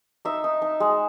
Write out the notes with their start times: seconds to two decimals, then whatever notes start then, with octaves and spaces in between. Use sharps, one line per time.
0.25 D#4 E5
0.44 D#4
0.62 D#4
0.80 G#3